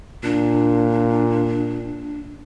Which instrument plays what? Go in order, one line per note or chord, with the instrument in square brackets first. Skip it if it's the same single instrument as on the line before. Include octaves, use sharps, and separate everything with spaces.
[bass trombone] A#2 [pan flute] D4